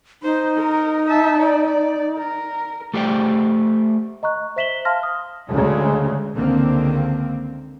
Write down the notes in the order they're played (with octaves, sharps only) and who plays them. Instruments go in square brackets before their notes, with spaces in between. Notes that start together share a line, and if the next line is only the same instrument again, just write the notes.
[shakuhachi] D#4 [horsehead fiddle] C5
[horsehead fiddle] A#4
E5 A5
D5
D5
A#4
[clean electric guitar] A3 G4 C5 D5 G5
[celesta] D#5 A#5 C#6 F#6
C5 E5 B6 E7 F#7 G7
F5 A5 C6 F6 A#6
D#6
[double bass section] D2 C#3 G#3
C#2 D3 D#3 A#3 C4